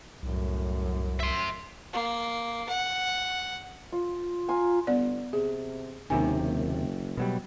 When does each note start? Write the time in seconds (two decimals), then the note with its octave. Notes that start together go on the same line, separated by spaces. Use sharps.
0.22 C2 F#2 A2
1.20 E5 C6
1.93 A#3
2.69 F#5
3.92 F4
4.48 F4 G#5 A#5
4.87 G1 B3 D5
5.33 C3 G#4
6.10 F#1 D#2 C3 D#3 D#4 G#5
7.17 B2 F#3 G3